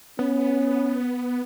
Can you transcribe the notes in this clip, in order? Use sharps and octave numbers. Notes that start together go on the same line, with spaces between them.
B3 C#4